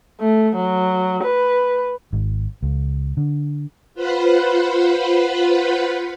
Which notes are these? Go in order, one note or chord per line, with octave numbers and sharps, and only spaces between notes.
A3
F#3
B4
G#1
C#2
D3
F4 B4 C5 F#5 B5